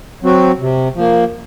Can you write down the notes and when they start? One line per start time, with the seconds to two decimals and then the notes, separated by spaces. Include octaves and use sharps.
0.23 F#3 C4 F#4
0.59 C3
0.95 F3 A#3